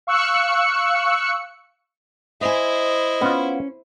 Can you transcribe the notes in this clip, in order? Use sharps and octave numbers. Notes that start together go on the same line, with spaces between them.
F5 C#6 E6 F#6 C#7
E4 C5 D#5 E5 G#5
B3 C#4 F4